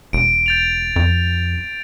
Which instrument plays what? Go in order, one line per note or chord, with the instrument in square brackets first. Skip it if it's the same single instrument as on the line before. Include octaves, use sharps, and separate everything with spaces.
[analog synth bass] E1 [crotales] D7
[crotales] G6 A6 F7
[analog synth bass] F2